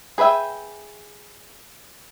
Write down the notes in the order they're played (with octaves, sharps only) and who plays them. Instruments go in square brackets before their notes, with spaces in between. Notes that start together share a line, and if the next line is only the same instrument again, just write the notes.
[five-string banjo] G#4 B4 C5 E5 G5